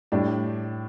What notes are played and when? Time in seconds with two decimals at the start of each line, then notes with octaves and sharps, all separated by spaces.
0.12 A2 G3 D4